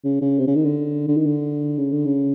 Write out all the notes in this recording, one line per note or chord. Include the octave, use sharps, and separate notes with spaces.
C#3
C#3
C3
C#3
D#3
D3
D3
D#3
D3
C#3
D3
C#3